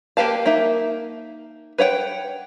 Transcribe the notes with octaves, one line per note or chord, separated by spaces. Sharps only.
A#3 G4 B4 F5 A5
A#3 D#4 E5
B4 C#5 F#5 G5